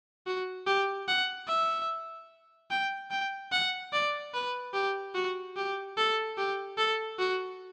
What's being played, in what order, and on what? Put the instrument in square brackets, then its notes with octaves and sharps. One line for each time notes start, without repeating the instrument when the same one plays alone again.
[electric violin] F#4
G4
F#5
E5
G5
G5
F#5
D5
B4
G4
F#4
G4
A4
G4
A4
F#4